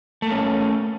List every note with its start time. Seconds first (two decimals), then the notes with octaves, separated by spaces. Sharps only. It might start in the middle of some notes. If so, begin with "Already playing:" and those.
0.22 A3
0.27 A#3
0.31 C#4